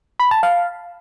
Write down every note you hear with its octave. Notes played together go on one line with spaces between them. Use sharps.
B5
A5
F5